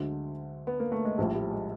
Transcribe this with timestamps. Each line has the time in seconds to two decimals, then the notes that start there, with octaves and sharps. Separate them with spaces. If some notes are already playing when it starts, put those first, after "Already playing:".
Already playing: D2 D3 F#3 G#3
0.67 B3
0.80 A#3
0.92 A3
1.05 G#3
1.18 A#1 A2 F3 G3
1.35 G3
1.51 G#3